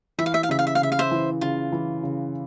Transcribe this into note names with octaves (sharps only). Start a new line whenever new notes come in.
E3 E5
F5
E5
F5
C#3 E5
F5
E5
F5
C#3 E5
F5
C5 E5
E3
C#3 F4
E3
C#3